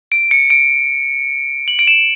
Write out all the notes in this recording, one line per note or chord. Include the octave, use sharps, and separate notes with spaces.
D7
C#7
D7
F#7
D7
E7